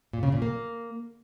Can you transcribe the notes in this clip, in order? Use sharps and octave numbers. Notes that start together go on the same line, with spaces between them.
A#2
C#3
A#2
A#3